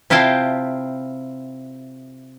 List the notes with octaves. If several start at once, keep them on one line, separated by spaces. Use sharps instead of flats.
C3 E4 F4 G5 A5